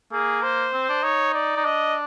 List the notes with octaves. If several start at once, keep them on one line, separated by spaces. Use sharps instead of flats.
A#3 G#4
C5
C4
D4
D#4 C#5
D5
D#4
D4 D#5